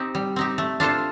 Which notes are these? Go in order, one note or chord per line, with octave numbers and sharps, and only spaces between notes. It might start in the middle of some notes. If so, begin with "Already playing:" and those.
Already playing: C4 D#4 G4
G3
C4 D#4 G4
A3
D4 F4 A4 C5